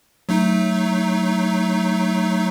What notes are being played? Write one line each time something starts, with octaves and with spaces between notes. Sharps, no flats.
F#3 A3 D#4